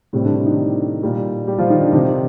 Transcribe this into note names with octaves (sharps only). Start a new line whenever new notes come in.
A2 C3 G3 C4
D3 D4
D3 D4
D#3 D#4
A#2 G3
G3 G4
F3 F4
D#3 D#4
D3 D4
C3 D#3 F3 D#4